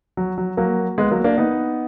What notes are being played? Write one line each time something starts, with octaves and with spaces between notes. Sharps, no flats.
F#3
F#3
F#3 A#3
G#3 B3
F#3 A#3
A#3 D4
B3 D#4